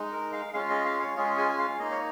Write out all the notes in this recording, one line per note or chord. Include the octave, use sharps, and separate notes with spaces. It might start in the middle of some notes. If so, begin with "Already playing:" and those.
Already playing: G#3 D#4
A#4
F5
G#3 C#4 F4 F5
D#5
F5
C#5
G#3 C#4 F4 G#4
G#5
G#5
F5
A#3 D#4 D#5
C#5